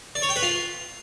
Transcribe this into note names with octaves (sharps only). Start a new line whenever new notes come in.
D5
C#5
G5
B4
F4